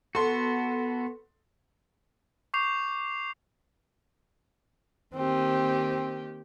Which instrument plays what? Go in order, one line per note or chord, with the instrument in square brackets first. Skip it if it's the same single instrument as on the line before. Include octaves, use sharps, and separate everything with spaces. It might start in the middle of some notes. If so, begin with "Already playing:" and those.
[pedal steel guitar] B3 F#4 [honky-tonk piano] A4 C6
[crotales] C#6 D6 G6 C7 F7
[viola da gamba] D#3 A#3 G4 [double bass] C4